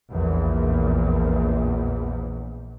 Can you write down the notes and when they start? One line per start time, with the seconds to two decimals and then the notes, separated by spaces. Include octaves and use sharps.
0.10 A#1 E2 A#2